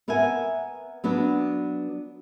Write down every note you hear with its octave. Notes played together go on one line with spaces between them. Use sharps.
B3 A#4 E5 F#5 G#5
F#3 B3 D4